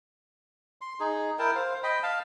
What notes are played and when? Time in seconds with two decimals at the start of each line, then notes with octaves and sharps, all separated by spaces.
0.81 C6
1.00 D#4 G#4
1.39 E4 A#4 G5 A5
1.55 C5 F5
1.83 D#5 G5 B5
2.03 F5 A5